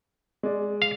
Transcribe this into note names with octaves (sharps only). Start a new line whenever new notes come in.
G#3 D5
F5